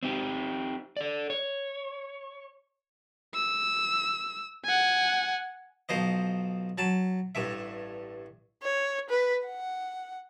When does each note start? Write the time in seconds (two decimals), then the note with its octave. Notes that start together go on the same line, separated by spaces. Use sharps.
0.03 C4 D#4 G4
0.97 A4 D5
1.30 C#5
3.35 E6
4.65 F#5 G#5
5.89 B1 F3 C5 D#5
6.78 F#3 A5
7.35 A1 G2 E5
8.63 C#5
9.10 B4
9.47 F#5